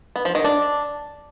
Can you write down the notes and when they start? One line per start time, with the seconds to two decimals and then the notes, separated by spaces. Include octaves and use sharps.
0.16 B3
0.25 F3
0.35 D#3
0.44 D4